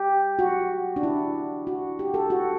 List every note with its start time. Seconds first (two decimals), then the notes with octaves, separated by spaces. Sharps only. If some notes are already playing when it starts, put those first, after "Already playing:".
Already playing: G4
0.39 F#4
0.96 D4
1.03 E4
1.67 F#4
1.99 G4
2.14 A4
2.30 F#4